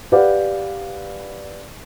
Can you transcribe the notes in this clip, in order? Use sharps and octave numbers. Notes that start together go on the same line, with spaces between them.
G4 B4 D5 F5 F#5